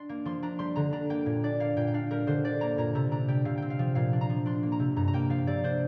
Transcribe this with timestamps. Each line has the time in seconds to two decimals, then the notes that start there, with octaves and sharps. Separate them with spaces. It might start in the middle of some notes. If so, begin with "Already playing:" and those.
Already playing: D4 C6
0.09 A#3
0.25 F3 C6
0.42 D4 A#5
0.59 G3 C6
0.76 D3 A#5
0.93 D4 A#5
1.10 A#3 G5
1.26 A#2
1.44 D4 D5
1.60 A#3 F5
1.76 A#2 G5
1.87 G5
1.94 D4 F5
2.11 G3 A#4
2.27 D3 C5
2.44 D4 D5
2.61 A#3 A#5
2.78 A#2 A#5
2.95 C3 A#5
3.11 D4 A#5
3.28 G3 G5
3.45 C3 F5
3.58 C4 G5
3.70 F5
3.79 F3
3.95 A#2 F5
4.13 D4
4.21 A#5
4.30 F3
4.46 D4 C6
4.63 A#3
4.72 A#5
4.80 C3
4.96 G2 A#5
5.08 A#5
5.13 A#3 G5
5.30 F3 F5
5.47 C3 D5
5.64 D4 C5